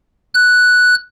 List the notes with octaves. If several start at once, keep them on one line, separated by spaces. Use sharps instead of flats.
F#6